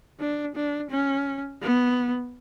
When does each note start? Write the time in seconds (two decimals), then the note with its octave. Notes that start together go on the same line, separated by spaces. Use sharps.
0.20 D4
0.56 D4
0.91 C#4
1.62 B3